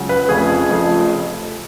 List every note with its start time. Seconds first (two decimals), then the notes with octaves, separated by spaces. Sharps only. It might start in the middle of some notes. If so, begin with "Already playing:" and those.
Already playing: C#2 C#3 F#3
0.09 B4
0.28 F1 F2 C#3 F3 A3 G#4
0.69 F1 F2 C#3 F3 A3